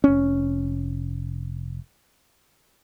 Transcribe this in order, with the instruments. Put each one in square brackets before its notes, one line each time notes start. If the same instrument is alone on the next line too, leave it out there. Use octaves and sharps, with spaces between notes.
[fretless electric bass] F1 C#4